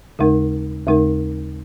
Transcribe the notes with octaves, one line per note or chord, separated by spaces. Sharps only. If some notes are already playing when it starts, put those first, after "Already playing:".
D#2 C#3 G#3 D#4 A#4
D#2 C#3 G#3 D#4 A#4